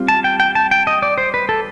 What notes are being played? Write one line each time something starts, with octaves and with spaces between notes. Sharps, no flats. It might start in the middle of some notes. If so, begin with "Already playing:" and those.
Already playing: G3 C4 F4
A5
G5
G5
A5
G5
D#5
D5
C5
B4
A4